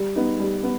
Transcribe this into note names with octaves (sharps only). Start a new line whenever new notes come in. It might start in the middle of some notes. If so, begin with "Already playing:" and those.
Already playing: G3
B3 D#4
G3
B3